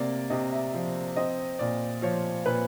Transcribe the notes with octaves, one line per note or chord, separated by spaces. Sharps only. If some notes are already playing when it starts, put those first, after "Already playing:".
Already playing: C3 A#3 D5
C3 D#5
E5
F3
C4 D#5
A#2 D5
F3 C#5
A#2 B4